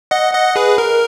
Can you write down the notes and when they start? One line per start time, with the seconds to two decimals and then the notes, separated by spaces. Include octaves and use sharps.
0.11 D#5 F#5
0.33 D#5 F#5
0.56 G#4 B4
0.78 A#4